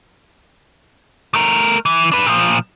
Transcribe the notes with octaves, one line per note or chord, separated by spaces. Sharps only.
A3 A#4
E3
D4 B4
A#2 F3